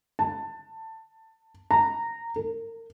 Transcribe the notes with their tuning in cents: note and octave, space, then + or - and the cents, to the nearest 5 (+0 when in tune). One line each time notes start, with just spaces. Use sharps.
A5 +15
A#5 -15
A#4 -35